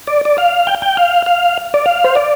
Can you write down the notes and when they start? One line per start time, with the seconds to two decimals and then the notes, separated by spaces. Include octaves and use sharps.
0.07 D5
0.25 D5
0.38 F5
0.67 G5
0.82 G5
0.97 F5
1.26 F5
1.74 D5
1.86 F5
2.04 C5
2.15 D5